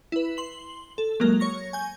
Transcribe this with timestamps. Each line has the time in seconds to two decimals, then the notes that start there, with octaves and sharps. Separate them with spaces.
0.12 E4 B4
0.37 C6 F#7
0.98 A4
1.20 F#3 G#3 A#3 A#4
1.40 C#5 C#6 A#6
1.73 G#5 G6